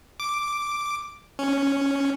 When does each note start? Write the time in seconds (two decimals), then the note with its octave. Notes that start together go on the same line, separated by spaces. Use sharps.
0.20 D6
1.39 C#4